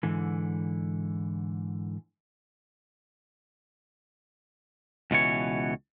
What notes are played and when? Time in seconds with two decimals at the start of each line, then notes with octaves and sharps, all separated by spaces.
0.03 G#2 D3 E3
5.11 C#2 B2 E3 C#5